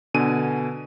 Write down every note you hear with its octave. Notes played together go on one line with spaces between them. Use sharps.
B2 D3 G#5 D#7